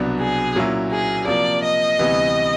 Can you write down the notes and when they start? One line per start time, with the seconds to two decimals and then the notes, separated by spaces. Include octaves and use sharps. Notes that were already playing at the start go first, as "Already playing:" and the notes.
Already playing: C2 B2 F#3 B3 D4
0.19 G#4
0.55 A#2 F#3 A#3 C#4 E4
0.92 G#4
1.27 C3 F3 A#3 D5
1.63 D#5
1.99 D2 C3 E3 G3 B3